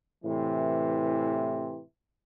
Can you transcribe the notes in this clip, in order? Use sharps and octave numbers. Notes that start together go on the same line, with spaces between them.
A2 C3 E3